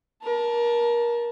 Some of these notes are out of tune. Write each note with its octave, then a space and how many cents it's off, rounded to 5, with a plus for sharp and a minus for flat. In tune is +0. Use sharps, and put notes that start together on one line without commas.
A#4 +25 A5 +0